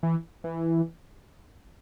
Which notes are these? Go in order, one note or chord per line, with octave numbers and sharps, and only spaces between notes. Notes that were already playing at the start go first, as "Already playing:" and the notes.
E3
E3